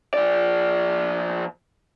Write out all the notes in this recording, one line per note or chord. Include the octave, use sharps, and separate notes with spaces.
F3 D5